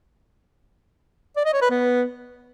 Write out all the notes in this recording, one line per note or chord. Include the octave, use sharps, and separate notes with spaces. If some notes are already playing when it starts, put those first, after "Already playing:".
D5
D#5
C#5
B4
B3